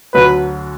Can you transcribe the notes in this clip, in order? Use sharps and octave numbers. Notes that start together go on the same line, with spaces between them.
D2 D3 F#3 B4